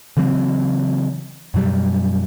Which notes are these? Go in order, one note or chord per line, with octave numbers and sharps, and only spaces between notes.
C#3 E3 F#3 C4
F#2 B2 F#3 G3